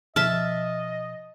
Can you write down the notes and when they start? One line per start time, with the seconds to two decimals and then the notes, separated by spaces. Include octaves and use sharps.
0.16 B2 F3 D#5 E5 A5 F6